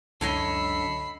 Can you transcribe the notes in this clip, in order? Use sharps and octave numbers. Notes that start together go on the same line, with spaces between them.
C#2 F#2 D3 A4 C#5 D#5 B5 C7